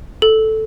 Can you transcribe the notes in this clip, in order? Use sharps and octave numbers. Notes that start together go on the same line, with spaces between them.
A4